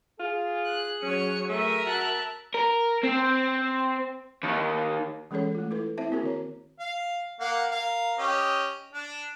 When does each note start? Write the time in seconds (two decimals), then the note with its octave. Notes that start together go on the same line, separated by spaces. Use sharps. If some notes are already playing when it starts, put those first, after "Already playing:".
0.20 F4 G#4
0.65 F#6
1.03 F#3 C#4 C#5 C#7 D#7
1.49 A3 A#4 E5 D#7
1.86 F#4 A5 F#6
2.54 A#4
3.04 C4
4.43 D#2
5.31 E3 G#3 C#4 G#4 A4 C#5
5.55 A3 F4
5.71 E4 A4 B4
5.97 C4 E4 C5 E5 A5
6.11 A#3 C4 E4 F#4 G#4 A#4
6.23 D#3 C#5 A#5
6.80 F5
7.40 A#3 F5 F#5
7.72 A#4 F5
8.19 C#4 G4 D#5
8.93 D4